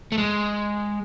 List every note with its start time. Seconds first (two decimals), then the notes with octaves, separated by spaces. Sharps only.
0.12 A3
0.18 G#3